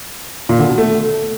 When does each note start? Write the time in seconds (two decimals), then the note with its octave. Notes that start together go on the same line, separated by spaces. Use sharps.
0.49 A#2
0.59 D3
0.68 B2
0.78 A3